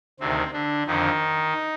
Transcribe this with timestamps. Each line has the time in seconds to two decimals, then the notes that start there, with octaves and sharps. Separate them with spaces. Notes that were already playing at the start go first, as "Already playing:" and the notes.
0.20 D2 C3 D#3 C4
0.53 D3 D4
0.86 F2 D3 D#3 F3 D#4